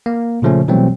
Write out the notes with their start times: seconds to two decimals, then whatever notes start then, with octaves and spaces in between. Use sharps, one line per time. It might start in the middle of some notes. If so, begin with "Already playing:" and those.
0.06 A#3
0.42 A#2 C#3 F3 A3 C#4
0.68 B2 E3 F#3 G3 A3 C4